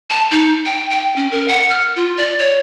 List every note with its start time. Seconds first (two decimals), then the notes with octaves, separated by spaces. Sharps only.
0.10 A5
0.31 D#4
0.65 G5
0.90 G5
1.16 C#4
1.31 A#4
1.48 F#5
1.70 F6
1.96 F4
2.17 D5
2.39 C#5